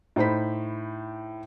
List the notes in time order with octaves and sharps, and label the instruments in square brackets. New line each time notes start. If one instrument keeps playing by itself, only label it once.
[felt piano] A2 D#4 C5 B5 B6